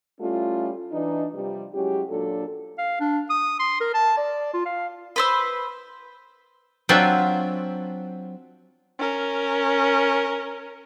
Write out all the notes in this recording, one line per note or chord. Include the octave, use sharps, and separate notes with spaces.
G3 A3 C#4 E4 F4
E3 D4 D#4
C3 F3 G3
F#3 G#3 C#4 E4 G4
A#2 F#3 D4 F#4 A4
F5
D4
D#6
C6
A#4
A5
D5
F4
F5
B4 C5 E6
F#3 C4 D4 F4 E5
C#4 A#4